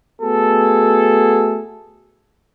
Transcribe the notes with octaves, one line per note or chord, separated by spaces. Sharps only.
A3 B3 F#4 G#4 A4